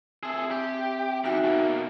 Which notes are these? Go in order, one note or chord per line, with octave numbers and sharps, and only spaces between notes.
C4 G#4 A4 E5
G4
E2 D#4 F#4 E5
B2 A#3